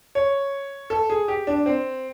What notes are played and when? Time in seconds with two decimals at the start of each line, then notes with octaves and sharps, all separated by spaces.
0.15 C#5
0.90 A4
1.10 G#4
1.28 G4
1.47 D4
1.66 C4